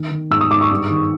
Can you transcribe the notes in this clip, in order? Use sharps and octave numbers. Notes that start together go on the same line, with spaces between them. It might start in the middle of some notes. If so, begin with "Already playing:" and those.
Already playing: D#3
D#3
G#2 E6
D#6
G#2 D6
C#6
G2
D#3